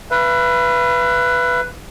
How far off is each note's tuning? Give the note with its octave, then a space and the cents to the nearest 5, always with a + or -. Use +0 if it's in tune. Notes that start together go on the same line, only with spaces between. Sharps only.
B4 +0 E5 +45